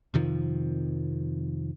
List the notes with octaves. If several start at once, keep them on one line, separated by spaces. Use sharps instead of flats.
F2 C3 D#3 F3